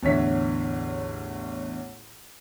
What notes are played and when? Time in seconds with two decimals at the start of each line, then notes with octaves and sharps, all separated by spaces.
0.03 A1 E2 D3 C#5 E5 B6